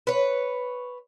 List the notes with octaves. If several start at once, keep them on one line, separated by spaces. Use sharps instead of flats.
B4 C#5